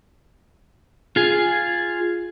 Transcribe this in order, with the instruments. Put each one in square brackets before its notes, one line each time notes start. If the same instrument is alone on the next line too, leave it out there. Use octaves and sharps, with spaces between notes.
[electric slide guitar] F4 G#4